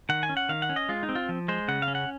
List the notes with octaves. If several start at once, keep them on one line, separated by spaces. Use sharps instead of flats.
D#3 F#5
G#5
C#4
F#5
D#3 F5
F#5
C#4
D#5
G#3 F4
D#4
C4
F4
F3
G#3 C5
C#3 F#5
F5
C#4
F#5